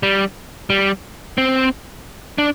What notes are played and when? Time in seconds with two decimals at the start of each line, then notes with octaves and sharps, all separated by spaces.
0.03 G3
0.70 G3
1.38 C4
2.38 D4